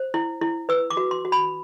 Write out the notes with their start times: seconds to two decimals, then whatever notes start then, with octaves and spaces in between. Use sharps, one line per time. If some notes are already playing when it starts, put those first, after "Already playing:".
Already playing: C5
0.14 E4
0.41 E4
0.69 B4 E6
0.90 D6
0.97 F#4
1.11 C6
1.25 F#4
1.32 B5